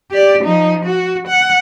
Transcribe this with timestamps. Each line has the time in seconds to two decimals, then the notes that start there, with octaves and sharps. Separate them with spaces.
0.11 G4 D5
0.44 F3 D#4
0.85 F#4
1.27 F#5